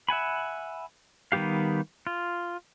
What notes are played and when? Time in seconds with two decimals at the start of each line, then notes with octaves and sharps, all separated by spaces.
0.09 E5 F#5 G#5 B5
1.32 D#3 G3 B3 G4 F5
2.07 F4